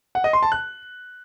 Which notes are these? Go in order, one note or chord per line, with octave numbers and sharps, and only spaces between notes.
F#5
D#5
C6
A5
F#6